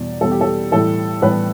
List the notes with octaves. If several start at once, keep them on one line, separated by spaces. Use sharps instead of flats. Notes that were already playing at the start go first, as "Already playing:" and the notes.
Already playing: E2 B2 G3 D5
E2 B2 G3 A4
G4
A4
A2 E3 G3 A4
A2 E3 G3 B4